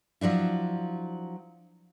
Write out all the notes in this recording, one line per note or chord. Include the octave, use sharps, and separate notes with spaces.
F3 F#3 D4 E4